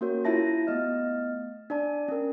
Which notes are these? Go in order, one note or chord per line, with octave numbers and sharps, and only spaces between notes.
A#3 C#4 F#4 A#4 C#5
E4 F4 E5 A5 A#6
A3 B3 D#5 F6
D4 D5 A5
C#4 A#4